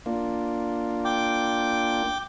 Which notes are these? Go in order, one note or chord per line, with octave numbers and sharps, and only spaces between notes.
A#3 D4 F4
G5 D6